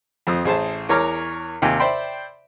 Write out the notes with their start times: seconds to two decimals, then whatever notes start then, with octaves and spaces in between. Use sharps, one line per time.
0.27 F2 C4 D#6
0.45 A1 G#4 C5 E5 A5
0.89 E2 A#4 C#5 A#5 D6 F6
1.62 D#2 C3 G5 G#5
1.79 C5 D5 E5 G5 B5 C6